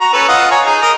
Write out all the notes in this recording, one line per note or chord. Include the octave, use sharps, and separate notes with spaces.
F#4 A#5
C#4 A4 B4
F4 D#5 F#5
C#5 G#5 A#5
D#4 G#4
A#4 D#5